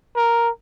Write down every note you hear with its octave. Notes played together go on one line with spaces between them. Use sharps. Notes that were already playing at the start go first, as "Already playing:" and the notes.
A#4